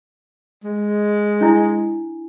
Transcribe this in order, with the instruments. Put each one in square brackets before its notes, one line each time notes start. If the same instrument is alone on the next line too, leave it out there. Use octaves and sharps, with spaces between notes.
[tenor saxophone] G#3
[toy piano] D4 E4 G#5